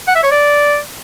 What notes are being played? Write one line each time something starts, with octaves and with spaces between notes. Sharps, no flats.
F#5
E5
C#5
D5